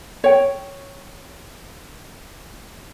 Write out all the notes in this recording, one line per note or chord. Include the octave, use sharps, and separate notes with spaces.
C#5 G5